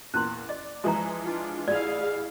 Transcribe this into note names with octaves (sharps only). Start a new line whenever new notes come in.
E2 A#2 C#4 E4 C6
D5 D#5
E3 F3 G#3 E5 A#5
D4 F4
A1 E4 G#4 D5 F5